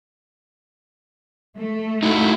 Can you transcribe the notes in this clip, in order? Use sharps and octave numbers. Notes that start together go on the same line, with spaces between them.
A3
D#4 E4 F#4